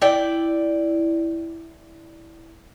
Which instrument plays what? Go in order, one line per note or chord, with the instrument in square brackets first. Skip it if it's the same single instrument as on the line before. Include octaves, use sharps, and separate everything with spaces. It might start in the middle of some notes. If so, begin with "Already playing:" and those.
[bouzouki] E4 D5 G5